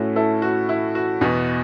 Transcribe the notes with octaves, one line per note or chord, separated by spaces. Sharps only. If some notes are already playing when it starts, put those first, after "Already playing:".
Already playing: A2 A3 C#4 E4 F#4
E4 A4
F#4
E4
F#4
E2 B2 B3